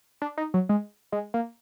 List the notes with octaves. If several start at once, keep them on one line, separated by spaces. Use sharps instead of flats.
D4
D#4
F#3
G#3
G#3
A#3